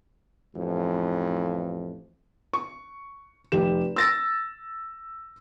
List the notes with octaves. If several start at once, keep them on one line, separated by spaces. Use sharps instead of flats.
A1 F2
C#6
F1 G4 E7
E6 A6 A#6